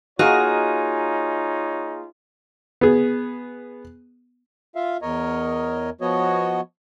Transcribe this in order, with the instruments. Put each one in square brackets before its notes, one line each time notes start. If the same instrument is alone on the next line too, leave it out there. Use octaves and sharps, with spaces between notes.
[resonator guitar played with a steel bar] A#3 F#4 D#5 [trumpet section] D#4 F4 C#5 [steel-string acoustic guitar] G#4
[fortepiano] B3 G#4
[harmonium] F4 E5 F5
E2 A#4 C#5 D#5
F3 B3 F#4 C#5 D#5